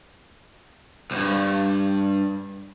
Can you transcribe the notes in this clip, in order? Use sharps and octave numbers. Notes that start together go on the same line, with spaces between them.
C2 G2